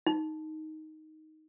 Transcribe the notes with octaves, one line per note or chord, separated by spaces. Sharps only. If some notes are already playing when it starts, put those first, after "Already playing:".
D#4